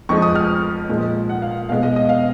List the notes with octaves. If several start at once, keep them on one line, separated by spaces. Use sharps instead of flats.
F2 F3 G#3 C#6
D#6
F6
A#2 F3 G#3
F#5
F5
B2 G#3 F5
D#5
D#5
F5